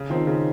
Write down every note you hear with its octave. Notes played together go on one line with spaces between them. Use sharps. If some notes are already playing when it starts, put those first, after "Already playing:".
Already playing: C#3
D#3 F3 C4 D#4
C#3